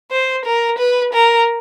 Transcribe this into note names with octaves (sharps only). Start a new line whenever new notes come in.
C5
A#4
B4
A#4